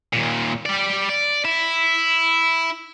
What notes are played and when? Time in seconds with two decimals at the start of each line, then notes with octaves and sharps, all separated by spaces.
0.13 D#2 A#2
0.66 G3 D5
1.09 D5
1.45 E4